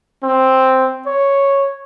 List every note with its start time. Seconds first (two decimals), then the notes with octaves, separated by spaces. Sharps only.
0.23 C4
1.07 C#5